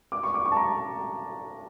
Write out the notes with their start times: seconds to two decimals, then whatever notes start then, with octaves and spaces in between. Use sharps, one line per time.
0.12 D6
0.23 C#6
0.34 D6
0.46 C#6
0.52 A5
0.57 A#5